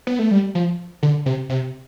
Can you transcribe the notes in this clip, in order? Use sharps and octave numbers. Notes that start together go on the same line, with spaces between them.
B3
A3
G3
F3
D3
C3
C3